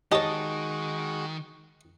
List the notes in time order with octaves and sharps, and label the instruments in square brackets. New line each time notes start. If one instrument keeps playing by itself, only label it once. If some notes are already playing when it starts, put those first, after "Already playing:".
[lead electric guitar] D#3 [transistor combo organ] G#3 F#4 [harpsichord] G4 C#5 [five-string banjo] D#5 A5